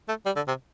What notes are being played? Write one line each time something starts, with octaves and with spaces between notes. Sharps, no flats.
A3
G3
D3
C3